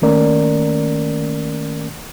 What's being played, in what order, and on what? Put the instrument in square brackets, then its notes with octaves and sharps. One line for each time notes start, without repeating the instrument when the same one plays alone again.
[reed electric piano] D#3 A3 A#3 C#4 A#4 D5